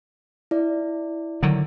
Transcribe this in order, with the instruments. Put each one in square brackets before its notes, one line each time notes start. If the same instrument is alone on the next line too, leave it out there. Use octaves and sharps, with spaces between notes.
[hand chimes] E4 D5
[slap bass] D3 D#3 F#3